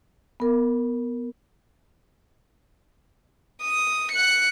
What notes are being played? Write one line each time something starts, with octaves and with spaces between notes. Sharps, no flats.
B3 A#4
D#6
F#6 C#7